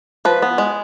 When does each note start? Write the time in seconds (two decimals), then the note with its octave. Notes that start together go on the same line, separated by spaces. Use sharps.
0.25 F3 B4
0.42 B3
0.58 G#3